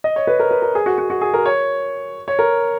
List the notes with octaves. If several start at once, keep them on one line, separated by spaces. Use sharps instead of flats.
D#5
C#5
B4
A#4
B4
A#4
G#4
F#4
F#4
F#4
G#4
A#4
C#5
C#5
A#4